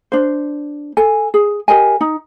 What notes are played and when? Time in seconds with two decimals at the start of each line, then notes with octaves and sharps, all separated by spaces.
0.12 D4 C5
0.97 A4 G#5
1.34 G#4
1.68 G4 A#4 D#5 G#5
2.01 D#4